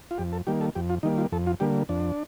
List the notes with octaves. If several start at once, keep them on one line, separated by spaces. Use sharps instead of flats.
F4
F2 G4
A4
D#3 G3 A#3 G4
A4
F2 G4
F4
D#3 G3 A#3 D#4
F4
F2 A4
F4
D3 G3 A#3 G4
F2 D4